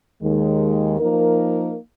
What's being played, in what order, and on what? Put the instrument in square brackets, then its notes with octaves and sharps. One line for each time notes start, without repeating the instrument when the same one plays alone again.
[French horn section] D#2 D#3 G#3
F3 A#3 D#4 A#4